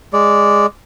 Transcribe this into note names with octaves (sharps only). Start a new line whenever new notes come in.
G#3 D5